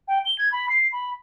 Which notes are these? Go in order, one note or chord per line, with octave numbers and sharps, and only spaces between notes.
G5
G7
G#6
B5
C7
B5